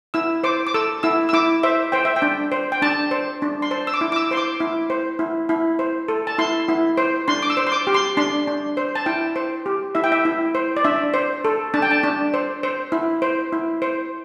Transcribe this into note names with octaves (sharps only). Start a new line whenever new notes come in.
E4 E6
C5 D6
D6
A4 E6
E4 E6
E6
E4 D6
C5 E5
C5 G5
E5
G5
D4
C5
G5
D4 A5
C5
D4
C6
C5 A5
E6
D6
E4
D6
E6
C5 C6
D6
E4
C5
E4
E4
C5
A4
A5
E4 C6
E4
C5
D4 C6
D6
E6
C5
C6
D6
G4
C6
D4 C6
D4
C5
A5
E4 G5
C5
G4
E4 E5
G5
E5
E4
C5
D5
D4 E5
C5
A4
D4 A5
G5
A5
D4
C5
C5
E4
C5
E4
C5